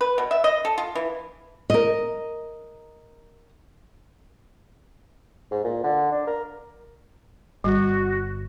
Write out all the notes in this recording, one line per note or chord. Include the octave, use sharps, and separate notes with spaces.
B4
B2
E5
D#5
A4
F4
E3
A#4 D#5
G#2
A#2
D3
D4
A#4
G1 G3 F#4